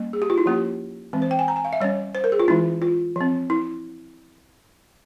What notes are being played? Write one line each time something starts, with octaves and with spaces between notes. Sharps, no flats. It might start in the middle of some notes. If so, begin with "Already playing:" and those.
Already playing: G3 A#3 C#4
G#4
G4
F4
E4
F3 A#3 C#4 G4
E3 G#3 C4
C5
G5
G#5
A#5
G#5
F5
E5
G3 C#4 C#5
C5
A#4
G#4
F4
E3 G#3 C#4 E4
F4
F3 C4
E4